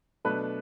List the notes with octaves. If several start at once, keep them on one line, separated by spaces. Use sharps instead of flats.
B2 F#3 A3 D4 B4